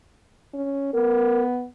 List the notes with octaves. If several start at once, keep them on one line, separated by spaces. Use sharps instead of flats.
C#4
B3 A#4